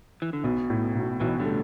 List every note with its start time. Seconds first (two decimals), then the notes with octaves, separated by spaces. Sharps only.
0.22 E3
0.33 D3
0.44 B1 B2
0.70 A2
0.95 B1
1.20 B1 B2 E3
1.40 D3 G3
1.45 A3